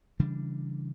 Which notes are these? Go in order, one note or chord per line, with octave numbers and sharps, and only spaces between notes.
C#3 E3 G3 D4